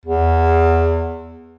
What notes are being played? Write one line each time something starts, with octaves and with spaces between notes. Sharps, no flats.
E2